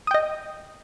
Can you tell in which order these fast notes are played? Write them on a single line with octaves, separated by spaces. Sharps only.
D#6 G5 D#5